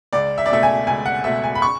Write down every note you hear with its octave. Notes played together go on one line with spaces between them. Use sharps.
C#2 D5
E5
D5
B2 A3 E5
G#5
C#2 G#5
F#5
B2 A3 E5
G#5
B5
C#6